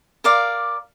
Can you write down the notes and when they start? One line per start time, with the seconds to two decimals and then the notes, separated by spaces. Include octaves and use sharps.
0.24 A#4 D5 F5